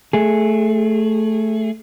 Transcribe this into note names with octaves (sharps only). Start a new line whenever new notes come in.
A3 G#4